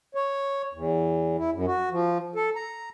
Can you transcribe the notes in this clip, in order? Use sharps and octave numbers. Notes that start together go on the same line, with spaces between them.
C#5
E2
E4
F#2
F#4
F3
A4
A#5